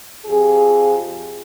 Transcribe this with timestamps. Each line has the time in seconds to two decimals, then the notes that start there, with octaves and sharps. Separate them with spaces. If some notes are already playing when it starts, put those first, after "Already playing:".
0.25 F2 F4 G4 G#4